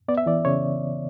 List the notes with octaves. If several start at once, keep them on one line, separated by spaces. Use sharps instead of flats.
B3 D5
E5
E3 D5
C#3 C#5